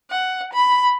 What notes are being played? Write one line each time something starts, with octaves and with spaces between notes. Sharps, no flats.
F#5
B5